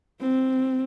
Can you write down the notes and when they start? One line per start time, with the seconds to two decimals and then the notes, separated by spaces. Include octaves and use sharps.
0.20 C4